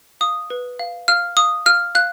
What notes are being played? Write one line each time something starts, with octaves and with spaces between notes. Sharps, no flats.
F5 D#6
B4
F5
F5 F6
F5 D#6
F5 F6
F5 F#6